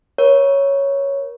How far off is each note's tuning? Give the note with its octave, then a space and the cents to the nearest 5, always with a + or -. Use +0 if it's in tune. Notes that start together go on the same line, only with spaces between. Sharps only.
A#4 +40 C#5 +0